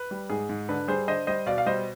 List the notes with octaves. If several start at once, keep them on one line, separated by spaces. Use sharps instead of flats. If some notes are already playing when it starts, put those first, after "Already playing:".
Already playing: B4
G3
G#2 G#4
G#2
D3 B4
G3 G#4 C5
D3 C5 D#5
G3 C5 D#5
B2 D5 F5
F5
G3 C5 D#5